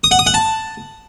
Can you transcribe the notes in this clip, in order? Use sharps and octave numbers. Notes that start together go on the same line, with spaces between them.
D#6
F#5
D#6
F#5
A5